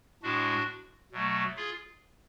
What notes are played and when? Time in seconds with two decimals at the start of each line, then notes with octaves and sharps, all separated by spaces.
0.23 A2 G#3 D4 F#4
1.12 B2 F#3 A3
1.57 F4 G#4